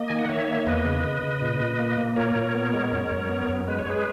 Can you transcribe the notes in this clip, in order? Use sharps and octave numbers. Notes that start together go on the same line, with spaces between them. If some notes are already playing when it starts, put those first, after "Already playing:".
Already playing: A#3 D#5
D#3 G#5
F#5
D#3 C#5 E5
A#3
E2 B4 D#5
C#3
C#3
C#3
A#2
A#2
A#3
A#3
A#2 A#4 C#5
A#2
B3
G#3
F#2
F#2
B3
F#2
G#3 B4
C#5
G#3 G#4 B4